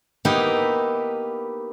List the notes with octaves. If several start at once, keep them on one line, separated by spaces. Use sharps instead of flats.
A#3 B3 D#4 E4 G4 A#4